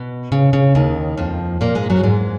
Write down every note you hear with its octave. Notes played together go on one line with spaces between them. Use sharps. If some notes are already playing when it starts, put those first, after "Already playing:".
Already playing: B2
C#3
C#3
D#2 D#3
F2 F3
A#2 A#3
G#2 G#3
F#2 F#3
G#2 G#3